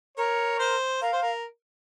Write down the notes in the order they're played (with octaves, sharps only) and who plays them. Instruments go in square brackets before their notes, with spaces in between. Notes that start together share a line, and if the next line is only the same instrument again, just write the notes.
[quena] A#4 [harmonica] C#5
[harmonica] C5
[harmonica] A#4 [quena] F5
[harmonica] C5
A#4